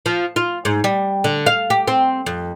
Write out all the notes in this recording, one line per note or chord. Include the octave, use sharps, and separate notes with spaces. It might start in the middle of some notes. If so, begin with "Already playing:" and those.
F3
F4
G#2
G3
D3
F5
G4
C4
F2